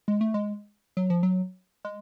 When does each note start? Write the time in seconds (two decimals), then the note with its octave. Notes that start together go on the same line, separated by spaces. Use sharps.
0.08 G#3
0.21 A3
0.34 G#3
0.97 F#3
1.10 F3
1.23 F#3
1.85 G#3